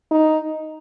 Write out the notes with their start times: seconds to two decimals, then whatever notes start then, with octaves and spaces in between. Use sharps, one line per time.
0.11 D#4